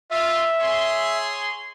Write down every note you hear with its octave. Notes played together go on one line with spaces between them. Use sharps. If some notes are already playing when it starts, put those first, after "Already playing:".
F4 E5
G#4 C#5 C6